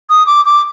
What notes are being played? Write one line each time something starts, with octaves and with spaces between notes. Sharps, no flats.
D#6
D6
D6